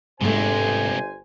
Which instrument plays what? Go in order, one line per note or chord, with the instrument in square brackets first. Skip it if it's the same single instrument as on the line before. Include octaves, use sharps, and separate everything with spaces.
[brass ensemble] G1 C5 G#5 [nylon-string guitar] G#2 A3 [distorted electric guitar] C3 G#3